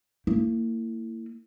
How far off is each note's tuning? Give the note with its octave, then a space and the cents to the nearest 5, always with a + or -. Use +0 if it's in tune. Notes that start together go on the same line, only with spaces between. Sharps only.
A#3 -35 E4 +10